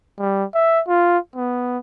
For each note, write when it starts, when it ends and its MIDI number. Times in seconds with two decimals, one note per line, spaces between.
0.19 0.45 55
0.54 0.82 76
0.88 1.18 65
1.36 1.78 59